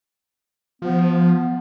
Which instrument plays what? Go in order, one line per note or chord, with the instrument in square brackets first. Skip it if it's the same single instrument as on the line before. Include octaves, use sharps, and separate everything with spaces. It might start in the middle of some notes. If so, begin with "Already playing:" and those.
[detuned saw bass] F3 [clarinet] B3